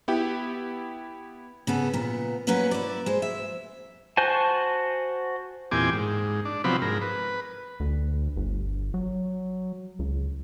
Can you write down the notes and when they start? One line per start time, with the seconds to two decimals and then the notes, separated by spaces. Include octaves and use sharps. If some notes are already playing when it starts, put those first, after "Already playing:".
0.08 B3 E4 G4 G5
1.67 C#3 B3 A4
1.93 A#2 B3
2.47 F#3 A#3 B3 C#4 B4 F#5
2.71 E4 D5
3.06 G#3 C5
3.22 E5
4.17 F#4 C5 G#5 A5
5.71 E2 A#2 C4 G4 G#5 D6
5.93 G#2
6.45 D4
6.64 C3 F3 F#3 B3 C4 B5
6.82 G#2 A#4
7.02 B4
7.80 D2
8.36 G1
8.94 F#3
9.99 C#2